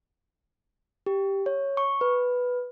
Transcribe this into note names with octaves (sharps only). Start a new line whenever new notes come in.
G4
C#5
C#6
B4